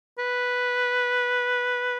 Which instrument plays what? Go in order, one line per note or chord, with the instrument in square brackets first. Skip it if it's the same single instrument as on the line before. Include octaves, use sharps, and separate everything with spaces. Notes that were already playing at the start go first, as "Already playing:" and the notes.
[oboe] B4